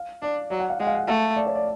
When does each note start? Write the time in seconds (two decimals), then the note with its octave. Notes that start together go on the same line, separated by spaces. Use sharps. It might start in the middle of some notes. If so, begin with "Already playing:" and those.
Already playing: F5
0.22 D4 D5
0.50 F#3 D5
0.60 F#5
0.70 F5
0.79 G#3 F#5
0.87 F5
0.94 F#5
1.08 A3 F5
1.36 D5
1.46 C#5
1.55 D5